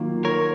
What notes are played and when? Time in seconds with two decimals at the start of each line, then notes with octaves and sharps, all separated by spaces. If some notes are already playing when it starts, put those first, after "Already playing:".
Already playing: D#3 F#3 A#3 F4
0.25 A#4 C#5